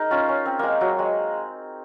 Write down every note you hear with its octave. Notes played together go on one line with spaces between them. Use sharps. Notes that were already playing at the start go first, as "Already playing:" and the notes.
Already playing: D#4 G#4 A#4
C#4 F4
C#4
C4
G#3 A#3
F#3
G#3